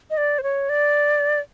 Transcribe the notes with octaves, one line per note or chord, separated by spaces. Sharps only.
D#5
D5
C5
C#5
D5